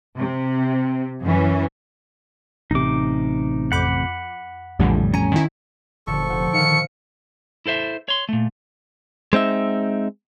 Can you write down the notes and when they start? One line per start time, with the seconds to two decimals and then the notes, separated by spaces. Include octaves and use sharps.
0.18 C3
1.24 F#2 E3 C#4
2.71 A1 C3 D#4 D6
3.72 F2 F#5 B5 D6 G6
4.80 A#1 F2 A2 D3 E3 G3
5.14 C#4 G#5 A#5
5.32 D#3 E4
6.07 F#1 A#2 D3 F3 A4 C#6
6.30 F1 C5 F#5
6.53 D#3 F5 F6 C#7
7.66 E4 A4 C5 E5
8.08 C#5 C6
8.29 A#2 A3
9.33 G#3 C4 D#4 E5